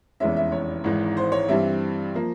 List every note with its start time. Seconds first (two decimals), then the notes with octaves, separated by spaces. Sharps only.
0.20 F1 E2 E3 G#3 C#4 E5
0.36 E5
0.52 C#5
0.84 G#1 G#2 E3 G#3
1.17 C5
1.32 C#5
1.48 G2 E3 G3 C4 E5
2.14 F3 A#3